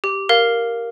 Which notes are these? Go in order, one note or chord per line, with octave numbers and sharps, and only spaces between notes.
G4
A#4 F5